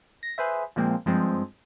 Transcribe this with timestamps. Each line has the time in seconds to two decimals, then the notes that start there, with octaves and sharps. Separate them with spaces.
0.23 A#6
0.38 G#4 B4 C5 E5
0.76 A#2 F3 G#3 A#3 C4
1.06 G2 F3 G#3 C4